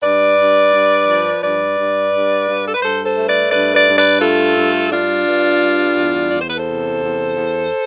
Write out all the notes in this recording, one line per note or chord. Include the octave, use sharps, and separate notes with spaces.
G2 B4 D5
G2
G2
F3
G2 B4 D5
G2
G2
G2
A4
B4
G2 A4 C5
A4 C5
A3
B4 D5
G2 B4 D5
B4 D5
G2
B4 D5
A3 F4 A4
G2
G2 D4 F4
G2
G3
E2
E2 D5
C5
B4
A4 C5
C3
E2
E2